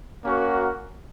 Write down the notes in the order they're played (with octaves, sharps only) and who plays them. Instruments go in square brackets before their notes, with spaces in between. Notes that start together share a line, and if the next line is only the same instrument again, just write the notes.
[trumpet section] A#3 C#4 F#4 A#4